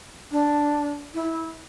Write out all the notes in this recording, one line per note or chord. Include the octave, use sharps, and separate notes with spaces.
D4
E4